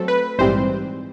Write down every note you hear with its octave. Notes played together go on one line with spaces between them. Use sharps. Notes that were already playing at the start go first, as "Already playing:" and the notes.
Already playing: F#3 A3 C4 A4
B4
A#1 G#2 E3 G3 C4 C5